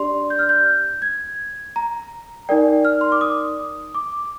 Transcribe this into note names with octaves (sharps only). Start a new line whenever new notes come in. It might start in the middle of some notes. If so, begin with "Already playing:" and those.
Already playing: D4 G4 D5 C6
G6
F6
G6
G#6
A#5
D#4 A#4 D5 G5
F6
C6
D6
D#6
D6